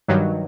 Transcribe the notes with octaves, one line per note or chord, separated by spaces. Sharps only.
G2 D#3 F#3